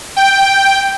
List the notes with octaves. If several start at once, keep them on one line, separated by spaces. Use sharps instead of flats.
G5